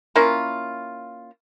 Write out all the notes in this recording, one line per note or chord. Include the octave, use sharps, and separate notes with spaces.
A#3 C#4 E4 F4